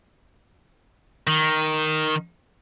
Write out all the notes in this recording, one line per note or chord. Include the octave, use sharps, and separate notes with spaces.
D#3